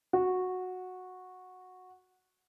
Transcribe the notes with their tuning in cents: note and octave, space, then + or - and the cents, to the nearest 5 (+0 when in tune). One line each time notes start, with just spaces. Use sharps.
F#4 -10